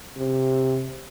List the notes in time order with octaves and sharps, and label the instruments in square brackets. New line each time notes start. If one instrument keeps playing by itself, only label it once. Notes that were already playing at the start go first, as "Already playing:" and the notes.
[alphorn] C3